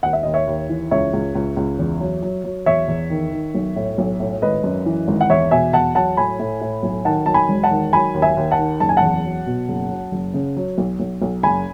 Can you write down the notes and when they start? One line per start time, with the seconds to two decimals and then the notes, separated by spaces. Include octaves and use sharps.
0.03 D#2 F#5
0.13 E5
0.23 D#2 D#5
0.34 C#5 E5
0.47 D#2
0.69 E3
0.91 C#2 C#5 E5
1.13 C#2
1.35 C#2
1.57 C#2
1.79 E2
2.01 F#3
2.22 F#3
2.44 F#3
2.66 E2 C#5 E5
2.88 E2
3.10 D#3
3.32 D#3
3.55 B1
3.76 A2
3.98 B1
4.20 A2
4.42 G#1 B4 D#5
4.64 F#2
4.86 E3
5.08 G#1
5.21 F#5
5.30 E2 C#5 E5
5.51 B2 E5 G#5
5.73 E2 F#5 A5
5.95 F#3 F#5 A5
6.17 A2 G#5 B5
6.39 A2
6.61 A2
6.83 B1
7.05 D#3 F#5 A5
7.26 F#3 A5
7.34 G#5 B5
7.49 E1
7.63 F#5 A5
7.71 D#3
7.93 F#3 G#5 B5
8.14 D#2
8.22 E5 G#5
8.37 D#2
8.51 F#5 A5
8.59 D#3
8.80 F#1 A5
8.89 G#5
8.97 F#5 A5
9.02 E2
9.25 F#3
9.46 B2
9.69 F#1
9.90 F#3
10.12 F#1
10.34 C#3
10.57 F#3
10.78 B1
11.00 B1
11.22 B1
11.43 F#1 G#5 B5